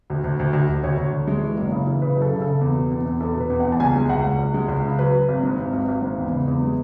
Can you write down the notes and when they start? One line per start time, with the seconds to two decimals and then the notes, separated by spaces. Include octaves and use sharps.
0.10 D2
0.24 D2
0.39 D2
0.53 D2
0.69 D2
0.84 D2 C#5
0.98 D2
1.13 D3
1.28 G#3
1.43 E3
1.58 F#1
1.72 C#3
1.87 E3
2.02 C#3 B4
2.17 F#2 A4
2.32 C#3
2.42 C#3 A4
2.61 E2
2.76 B2
2.91 E2
3.06 E2
3.21 E2 A4
3.35 B2
3.40 B4
3.50 E2
3.60 E2 F#5
3.72 A5
3.80 C#2 G#5
3.95 G#3
4.09 C#2 F#5
4.24 C#2
4.39 C#2
4.54 G#3
4.68 C#2
4.84 C#3
4.99 F#3 B4
5.13 F#3
5.28 G#1
5.43 G#2
5.58 G#1
5.73 G#1
5.88 G#1
6.02 G#2
6.18 E2
6.32 C#3
6.47 E2
6.62 G#3